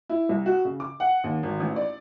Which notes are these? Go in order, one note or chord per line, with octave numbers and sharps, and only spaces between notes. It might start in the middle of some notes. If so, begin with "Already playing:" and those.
E4
C2
F#4
C#3
D6
F#5
D#2
G#1
A1
D5